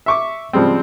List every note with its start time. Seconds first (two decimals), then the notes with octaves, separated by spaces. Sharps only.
0.06 E5 C#6 D6
0.53 C#3 F3 G3 G#3 C4